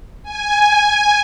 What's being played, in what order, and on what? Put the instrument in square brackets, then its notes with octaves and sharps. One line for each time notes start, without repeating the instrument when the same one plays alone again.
[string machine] G#5